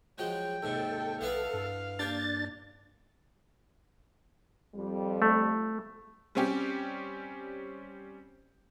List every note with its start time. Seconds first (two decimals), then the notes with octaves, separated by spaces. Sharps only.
0.18 F3 F#3 G#3 G5
0.63 D#2 G#2 C3 A4
1.21 B1 B3 E4 B4 F5
1.53 G2
1.99 A#3 D4 G4 A6
4.75 F2 G3
5.22 A3
6.35 G3 C4 C#4 G4